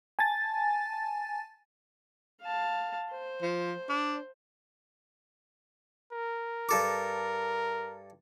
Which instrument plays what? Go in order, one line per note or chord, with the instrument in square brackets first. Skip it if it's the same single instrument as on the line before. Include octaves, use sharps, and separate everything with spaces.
[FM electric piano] G#5 A5 A6
[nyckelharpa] F5 A5
C5
[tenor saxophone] F3
D4
[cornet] A#4
[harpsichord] G2 A4 D6